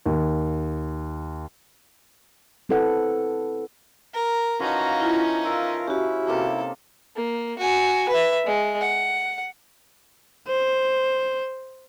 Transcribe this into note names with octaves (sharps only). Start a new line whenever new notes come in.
D#2
C4 E4 A4 B4 F#5
A#4
E3 F3 C#4 D#4 F#4 F5 A#5
E4 F4
F4 A#4 E6
C#4 E4 F#4 G4
C3 A#3 D#4 A4
A#3
F#4 G#5
B4 E5
G#3
F#5
C5